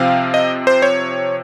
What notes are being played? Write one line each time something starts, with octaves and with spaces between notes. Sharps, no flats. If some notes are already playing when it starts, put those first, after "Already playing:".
Already playing: C3 F3 C4 F5
D#5
C5
C#5